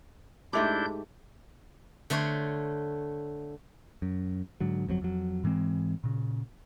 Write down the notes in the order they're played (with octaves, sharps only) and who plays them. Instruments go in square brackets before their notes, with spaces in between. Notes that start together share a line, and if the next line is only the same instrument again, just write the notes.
[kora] G#2 A3 G4 [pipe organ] D4 E4 G6
[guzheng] D3 A3 C5 C#5
[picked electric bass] F#2
G#2 D3 F#3
G1 F2 B2 F#3
F2 F#3
G#2 E3 G#3 C4
A#2 C#3